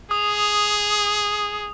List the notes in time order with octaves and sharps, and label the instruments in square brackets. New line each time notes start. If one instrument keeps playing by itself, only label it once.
[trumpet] G#4 [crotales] D#6